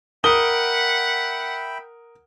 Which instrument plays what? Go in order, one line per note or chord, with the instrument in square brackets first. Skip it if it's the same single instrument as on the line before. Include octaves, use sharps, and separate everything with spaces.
[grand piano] A#4 D#6 G7 [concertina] E5 G5 B5 [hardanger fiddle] F#5